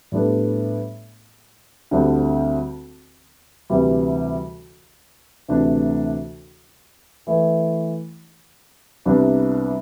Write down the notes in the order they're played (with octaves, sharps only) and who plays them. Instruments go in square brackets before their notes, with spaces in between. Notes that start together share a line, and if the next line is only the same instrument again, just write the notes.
[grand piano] A2 G3 B3 D4 A4
D2 D3 G3 C4
D2 C3 E3 G3
D2 C3 E3 A3 D4
E3 A3 E4
C2 C3 G3 B3 D4